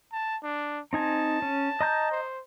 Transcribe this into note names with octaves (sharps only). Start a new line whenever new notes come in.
A5
D4
C4 D#4 G#5 A5
C#4
D#5 A#5 G6
C5